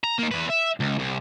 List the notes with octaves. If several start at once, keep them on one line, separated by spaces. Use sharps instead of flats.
A#5
A#3 D#4
E2 B4
E5
C#2
C2